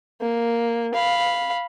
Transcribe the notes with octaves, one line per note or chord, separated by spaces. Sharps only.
A#3
F5 B5